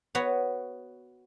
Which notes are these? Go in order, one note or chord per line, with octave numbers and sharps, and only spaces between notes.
B3 F#4 C#5